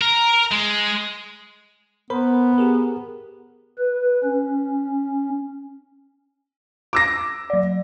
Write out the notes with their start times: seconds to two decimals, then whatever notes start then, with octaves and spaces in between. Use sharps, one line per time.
0.02 A#4
0.51 G#3
2.10 B3 A#4 C5 B5
2.58 G4 G#4 A#4
3.78 B4
4.24 C#4
6.93 D6 E6 A#6
7.50 F#3 D5